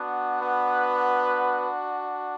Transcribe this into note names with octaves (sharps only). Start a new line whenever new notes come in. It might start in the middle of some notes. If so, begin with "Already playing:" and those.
Already playing: B3 D4 F#4
B3 B4